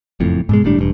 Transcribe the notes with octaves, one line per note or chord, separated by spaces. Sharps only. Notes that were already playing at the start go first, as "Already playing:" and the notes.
F#1 F2 A2
G#2 B2 G#3
G1 A2 G3 D4
E1 G2